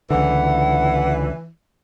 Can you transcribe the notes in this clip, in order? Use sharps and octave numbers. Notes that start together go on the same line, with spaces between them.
C#2 D3 E3 F#5